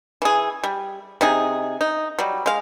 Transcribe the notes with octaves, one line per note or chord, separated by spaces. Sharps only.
E3 G#4
G3
C3 D#4 G#4
D#4
F#3 G3
G#3 F5